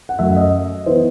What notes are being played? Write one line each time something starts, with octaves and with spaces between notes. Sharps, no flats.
F#5
F#2 F#3 A3 E5
D#5
E3 B3 C5